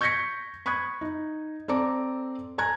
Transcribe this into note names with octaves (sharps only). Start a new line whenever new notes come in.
C#6 G6 G#6 A#6 B6 C#7
B5 C#6 D#6 F#6 G#6
D#4
C4 A4 D5 A#5 D6
A4 G#5 A#5 F#6 G#6